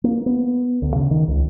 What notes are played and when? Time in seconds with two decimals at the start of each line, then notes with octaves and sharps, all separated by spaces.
0.04 A#3
0.26 B3
0.82 D2
0.96 C#3
1.11 D#3
1.28 C#2